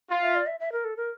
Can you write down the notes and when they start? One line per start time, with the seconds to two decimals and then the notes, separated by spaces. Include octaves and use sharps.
0.10 F4
0.23 E5
0.35 D5
0.47 E5
0.60 E5
0.72 A#4
0.85 A4
0.97 A#4